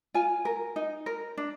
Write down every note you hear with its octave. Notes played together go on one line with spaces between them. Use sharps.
F4 G#5
A#4
D#4
A#4
D4